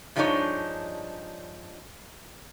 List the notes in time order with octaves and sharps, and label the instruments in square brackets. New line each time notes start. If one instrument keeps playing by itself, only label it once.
[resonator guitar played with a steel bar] G2 F3 G#3 D4 D#4 C#5